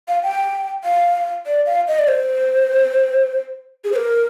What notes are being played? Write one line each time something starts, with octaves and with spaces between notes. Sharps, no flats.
F5
G5
F5
D5
F5
D#5
D5
C5
G#4
C5
A#4